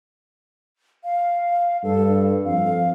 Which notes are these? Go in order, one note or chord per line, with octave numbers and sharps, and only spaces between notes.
F5
G2 A4
F2 F5